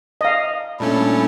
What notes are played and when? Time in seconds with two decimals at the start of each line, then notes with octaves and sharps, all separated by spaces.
0.21 D#5 F5
0.80 A#2 G3 A3 C#4 D4 E4